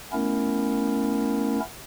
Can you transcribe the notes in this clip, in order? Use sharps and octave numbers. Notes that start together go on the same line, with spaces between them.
A3 B3 C#4 E4 A#4